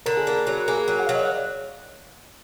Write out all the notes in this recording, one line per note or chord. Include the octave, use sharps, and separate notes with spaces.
D3 A#4
G#4
A#3 A#4
F#3
A#3 G#4
F#3
F#5
F#3 F5
D#5
D5